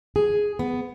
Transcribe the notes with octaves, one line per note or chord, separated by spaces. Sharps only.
G#4
B3